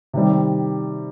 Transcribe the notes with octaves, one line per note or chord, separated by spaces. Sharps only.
C3 D#3 G3